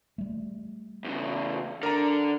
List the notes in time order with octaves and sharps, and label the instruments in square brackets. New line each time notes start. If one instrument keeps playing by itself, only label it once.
[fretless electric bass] G3 A3
[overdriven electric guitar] E2 C#3
[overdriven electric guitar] D3 [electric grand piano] A#4 A#5